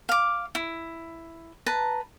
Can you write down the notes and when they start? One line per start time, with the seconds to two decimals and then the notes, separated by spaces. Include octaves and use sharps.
0.09 F5 D6
0.55 E4
1.66 B4 A5 A#5